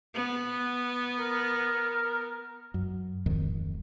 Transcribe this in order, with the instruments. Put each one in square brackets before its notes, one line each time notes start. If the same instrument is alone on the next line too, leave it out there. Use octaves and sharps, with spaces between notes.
[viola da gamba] B3
[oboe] A#4
[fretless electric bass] F#2
D1 F2 G#2 D#3